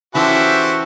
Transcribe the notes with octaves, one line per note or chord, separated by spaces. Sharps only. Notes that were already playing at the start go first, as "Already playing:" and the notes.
E3 C#4 F#4 G4 A4 C5 E5